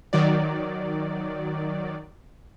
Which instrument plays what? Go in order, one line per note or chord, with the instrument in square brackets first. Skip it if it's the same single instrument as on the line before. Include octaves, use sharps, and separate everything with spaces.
[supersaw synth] D#3 F#3 D5